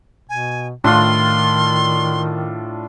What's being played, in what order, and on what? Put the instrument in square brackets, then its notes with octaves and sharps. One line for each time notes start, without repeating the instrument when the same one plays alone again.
[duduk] B2 [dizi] G#5
[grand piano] A2 [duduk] D#3 [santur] D4 F4 [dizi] C6